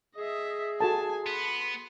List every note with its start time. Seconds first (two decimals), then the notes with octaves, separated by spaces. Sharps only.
0.17 G#4 D#5 E5
0.81 F#4 A4 G#5 A5
1.26 B3 B5 C6